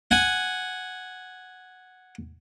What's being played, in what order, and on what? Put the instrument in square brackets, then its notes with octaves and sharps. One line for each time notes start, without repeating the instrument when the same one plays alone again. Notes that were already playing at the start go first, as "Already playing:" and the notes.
[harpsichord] F#5 G#5